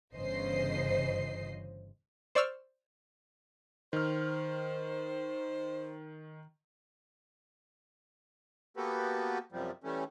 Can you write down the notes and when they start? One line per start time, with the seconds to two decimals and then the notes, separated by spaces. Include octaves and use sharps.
0.15 G1 C#3 E3 C5 D#5 C7
2.35 C5 D5 C#6 E6 F6
3.93 D#3 C5 F6
8.77 A#3 B3 F#4 G4 A4 B4
9.52 F#2 C3 F3 G3
9.84 E3 G3 A3 C#4